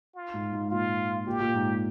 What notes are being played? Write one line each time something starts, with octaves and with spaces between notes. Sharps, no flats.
F4
G#2
G#2
A#2 F4
A#2 G4
A#2
G#2